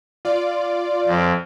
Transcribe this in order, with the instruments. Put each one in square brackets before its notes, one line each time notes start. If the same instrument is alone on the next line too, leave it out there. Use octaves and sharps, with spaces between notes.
[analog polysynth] F4 D5
[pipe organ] F2